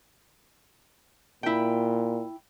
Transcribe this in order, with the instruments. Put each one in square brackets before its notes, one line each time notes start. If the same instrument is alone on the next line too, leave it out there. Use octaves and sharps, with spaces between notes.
[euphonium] A#2 [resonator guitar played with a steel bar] E4 G5